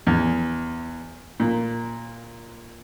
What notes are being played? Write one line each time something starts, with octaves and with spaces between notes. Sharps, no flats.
E2
A#2